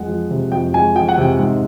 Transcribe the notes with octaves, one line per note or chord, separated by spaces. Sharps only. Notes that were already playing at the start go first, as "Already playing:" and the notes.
Already playing: F2 G#3 F#5
F3
C3
F2 G5
G#3 G#5
F3 G5
F#5
C3 G5
G#2